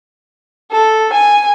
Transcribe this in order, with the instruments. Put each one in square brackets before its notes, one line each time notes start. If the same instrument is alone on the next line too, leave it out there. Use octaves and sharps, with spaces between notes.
[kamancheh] A4
G#5